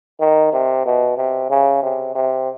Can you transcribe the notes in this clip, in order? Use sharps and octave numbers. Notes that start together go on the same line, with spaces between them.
D#3
C3
B2
C3
C#3
C3
C3